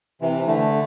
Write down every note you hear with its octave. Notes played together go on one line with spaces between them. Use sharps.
C3 E3
D3 A3